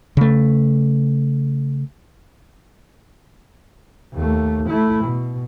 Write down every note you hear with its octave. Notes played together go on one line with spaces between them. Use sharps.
C#3 A3
D#2 A3
A3 E4
B2